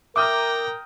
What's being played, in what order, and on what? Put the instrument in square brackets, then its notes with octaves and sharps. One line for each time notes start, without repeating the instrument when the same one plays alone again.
[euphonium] A#4 [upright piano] E5 D#6 F6 [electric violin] G5 A#5 [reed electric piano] D6